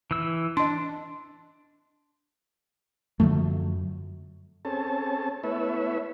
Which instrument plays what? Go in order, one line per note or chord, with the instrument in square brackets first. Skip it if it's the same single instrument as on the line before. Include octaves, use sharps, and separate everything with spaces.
[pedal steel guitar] E3 E6
[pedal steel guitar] D4 [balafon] D#5 C6
[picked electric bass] F#2 [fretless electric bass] D3 F3 A3
[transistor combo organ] C4 C#4 G#4 A4 A5
A3 B3 E4 B4 C#5 E5